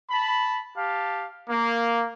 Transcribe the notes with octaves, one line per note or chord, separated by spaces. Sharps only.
A5 B5
G4 F5 A5
A#3